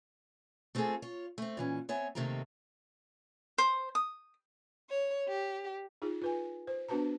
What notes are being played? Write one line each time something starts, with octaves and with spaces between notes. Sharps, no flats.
A3 C4 F4 F#4 G#4 A4
F4 C#5
A3 C4
A#2 E3 C#4
B3 C4 C#5 E5 G#5
D#2 C3 D#3 A3 C4 A#5
C5
D#6
C#5
G4
D#4 F4 G#4
F4 B4 G#5
C5
B3 D4 F#4 B4 A5 A#5